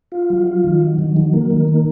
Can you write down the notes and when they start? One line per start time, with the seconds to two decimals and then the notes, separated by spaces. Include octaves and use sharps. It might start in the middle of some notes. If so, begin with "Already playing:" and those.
0.12 F4
0.30 F#3
0.47 F4
0.64 D#3
0.81 F#3
0.99 D#3
1.17 F#3
1.34 A#3
1.50 D#3
1.68 A#3